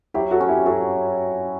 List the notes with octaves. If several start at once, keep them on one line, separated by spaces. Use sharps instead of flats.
F#3 E4 G4
F#4 A4
C#4
E4 G4
F#3 F#4 A4